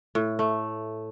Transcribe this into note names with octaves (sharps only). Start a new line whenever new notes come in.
A2
A3